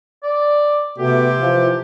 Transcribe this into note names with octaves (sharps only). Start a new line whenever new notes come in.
D5
C3 A3 B3 F#4 G4
E3 F3 F4